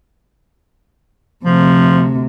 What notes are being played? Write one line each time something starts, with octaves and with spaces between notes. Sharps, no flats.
D2 C3 F3